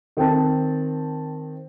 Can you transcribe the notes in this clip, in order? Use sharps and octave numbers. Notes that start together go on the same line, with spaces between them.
D#3 C4 G5 A5